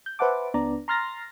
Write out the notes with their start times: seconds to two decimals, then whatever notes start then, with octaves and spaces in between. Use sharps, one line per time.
0.06 G6
0.19 B4 C5 E5 F#5 A5 D6
0.54 C#2 B3 D4 D5 A#5
0.88 A#5 C6 F6 A6 A#6